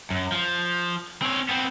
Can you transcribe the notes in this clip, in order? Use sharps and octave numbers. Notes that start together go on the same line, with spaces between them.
F#2
F3
C4 C#5
B3 C4